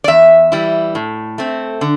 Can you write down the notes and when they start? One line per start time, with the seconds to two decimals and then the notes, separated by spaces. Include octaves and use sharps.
0.04 D5
0.08 E2 E5
0.52 E3 G3 E4
0.95 A2
1.38 A3 C4
1.81 D3